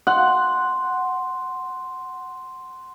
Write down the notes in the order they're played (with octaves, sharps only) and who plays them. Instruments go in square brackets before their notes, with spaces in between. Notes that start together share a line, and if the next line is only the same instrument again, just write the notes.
[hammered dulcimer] F#5 [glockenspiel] C6 F#6